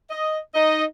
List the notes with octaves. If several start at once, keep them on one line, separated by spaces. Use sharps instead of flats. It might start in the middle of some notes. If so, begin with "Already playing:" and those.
D#5
D#4 D#5